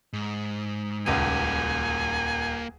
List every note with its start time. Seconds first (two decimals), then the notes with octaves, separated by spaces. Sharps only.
0.13 G#2
1.06 D#1 C#2 A#3 F#4 G#5 D#7